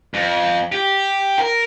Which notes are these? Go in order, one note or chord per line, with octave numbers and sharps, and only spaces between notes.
F2
G4
A#4